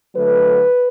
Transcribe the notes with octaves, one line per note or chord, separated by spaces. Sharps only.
D3 F#3 A3 B4